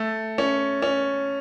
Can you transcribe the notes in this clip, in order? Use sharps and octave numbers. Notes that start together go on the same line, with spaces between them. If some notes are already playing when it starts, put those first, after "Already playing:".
Already playing: A3
C#4
C#4